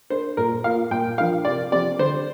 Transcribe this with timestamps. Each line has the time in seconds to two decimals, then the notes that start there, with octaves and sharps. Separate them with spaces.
0.10 D4 A#4 C5
0.37 A#2 A#4
0.64 A#3 F4 A#4 F5
0.91 A#2 G5
1.18 F3 D4 A#4 F5
1.45 C3 D5
1.72 F3 C4 G4 D5
1.99 D3 C5